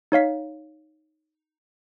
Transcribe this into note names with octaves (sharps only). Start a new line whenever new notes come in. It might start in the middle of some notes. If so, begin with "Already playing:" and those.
D#4 C#5 F5 B6